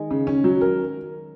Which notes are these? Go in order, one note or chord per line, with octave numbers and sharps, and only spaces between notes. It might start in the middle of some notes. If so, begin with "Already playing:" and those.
Already playing: D#3 G#3
C#3
C#4
F#3
A#4